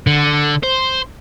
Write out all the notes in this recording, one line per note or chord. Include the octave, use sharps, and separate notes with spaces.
D3
C5